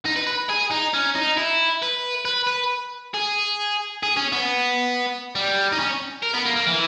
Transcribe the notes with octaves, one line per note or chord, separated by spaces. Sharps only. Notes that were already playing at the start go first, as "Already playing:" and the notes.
D#4
B4
B4
G#4
D#4
C#4
D#4
E4
B4
B4
B4
G#4
G#4
C#4
B3
G3
D#4
C#4
A#4
B3
A#3
A#3
E3